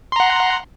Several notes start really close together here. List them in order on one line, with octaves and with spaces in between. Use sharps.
C6 A#5 F#5